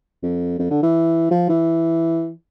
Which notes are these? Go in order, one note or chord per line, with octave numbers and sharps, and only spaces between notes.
F2
F2
D3
E3
F3
E3